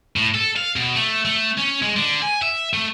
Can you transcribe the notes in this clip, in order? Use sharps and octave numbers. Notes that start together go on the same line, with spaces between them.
A2
A4
F5
B2
A3
A3
C#4
G#3
D3
G#5
E5
A3